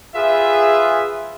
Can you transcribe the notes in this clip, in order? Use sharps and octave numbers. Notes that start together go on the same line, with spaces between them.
F4 G#4 B4 E5